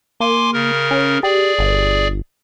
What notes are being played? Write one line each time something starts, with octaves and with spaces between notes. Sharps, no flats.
A#3 G#5 C6 D6
C#3 A#4
C#4
G4 G#4 D5
G1